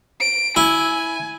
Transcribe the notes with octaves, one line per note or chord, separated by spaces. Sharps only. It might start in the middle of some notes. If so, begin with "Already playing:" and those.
D7
E4 G#5